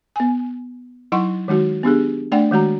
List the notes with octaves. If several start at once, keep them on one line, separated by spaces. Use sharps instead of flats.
B3 G#5
F#3 D#4 E4 F#5 C6 C#6
D#3 G#3 D#4 F#4
B3 D4 G4 G#4
A3 D4 D5 F#5 G5
D#3 G#3 F#4 A#5